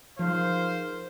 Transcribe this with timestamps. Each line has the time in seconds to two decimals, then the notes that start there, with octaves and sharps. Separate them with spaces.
0.19 F3 D#4 G#4 A#4 C5 F5